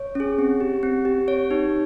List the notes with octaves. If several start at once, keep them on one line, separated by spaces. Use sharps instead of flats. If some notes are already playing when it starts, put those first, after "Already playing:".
Already playing: C#5
C#4 G#4
C4
G4
C4
G4
C4 C#5
D#4 G4